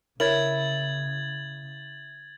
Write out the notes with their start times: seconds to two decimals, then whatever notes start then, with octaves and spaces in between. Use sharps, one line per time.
0.20 C#3 E4 A#4 C#5 G#6 A6 F#7